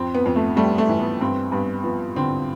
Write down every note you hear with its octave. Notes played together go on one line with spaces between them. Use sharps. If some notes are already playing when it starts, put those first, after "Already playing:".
Already playing: F2 C4
B3
F2
A3
G3 A3
A3
E3
B3
G2 C4
G2 B3
F3 B3
D3 C4